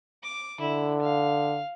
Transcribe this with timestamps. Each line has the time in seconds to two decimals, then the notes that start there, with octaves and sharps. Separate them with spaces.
0.23 D6
0.60 D3 E4
1.02 F5